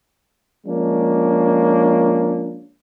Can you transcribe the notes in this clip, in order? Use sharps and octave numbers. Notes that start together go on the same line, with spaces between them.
F3 G#3 A#3 C#4 D4